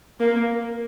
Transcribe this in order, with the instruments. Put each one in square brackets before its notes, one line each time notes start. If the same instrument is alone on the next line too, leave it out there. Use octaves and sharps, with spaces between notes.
[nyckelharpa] A#3